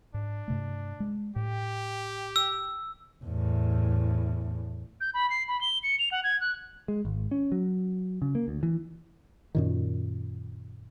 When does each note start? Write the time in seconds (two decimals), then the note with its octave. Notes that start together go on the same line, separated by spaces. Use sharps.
0.14 G#2 D4
0.48 G2 C3 A3
1.00 G#3
1.36 A2 G4
2.36 E6
3.25 E2 A2
5.01 G6
5.14 B5
5.30 C7
5.48 B5
5.61 G7
5.83 C#7
5.99 F7
6.11 F#5
6.24 G#6
6.41 F#6
6.88 G#3
7.05 G#1
7.31 C#4
7.52 F#3
8.22 C#3
8.35 A#3
8.48 D2
8.63 E3
9.55 F#2 A#2 D#3